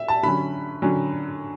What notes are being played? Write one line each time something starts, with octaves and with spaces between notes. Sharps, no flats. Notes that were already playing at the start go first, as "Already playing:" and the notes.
Already playing: E5
A5
D3 F#3 C#4 B5
D3 F#3 C#4